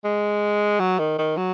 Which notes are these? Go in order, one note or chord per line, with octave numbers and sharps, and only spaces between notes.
G#3
F#3
D#3
D#3
F#3